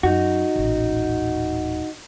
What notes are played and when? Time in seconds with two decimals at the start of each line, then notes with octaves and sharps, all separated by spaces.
0.03 F#2 D#4 F#4
0.56 D#1 A1